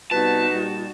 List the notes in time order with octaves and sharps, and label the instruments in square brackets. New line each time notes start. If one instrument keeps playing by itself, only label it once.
[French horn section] C3 G3 B3 [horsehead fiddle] D#4 F#4 [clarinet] B4 [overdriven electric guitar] A5
[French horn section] A#2 G3